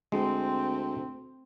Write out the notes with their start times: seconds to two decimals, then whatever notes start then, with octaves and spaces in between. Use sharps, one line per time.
0.12 D2 G#3 C4